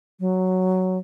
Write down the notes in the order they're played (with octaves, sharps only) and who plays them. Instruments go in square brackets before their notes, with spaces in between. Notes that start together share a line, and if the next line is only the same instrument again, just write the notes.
[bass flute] F#3